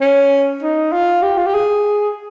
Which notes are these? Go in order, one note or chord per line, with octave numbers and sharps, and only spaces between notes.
C#4
D#4
F4
G4
F4
G4
G#4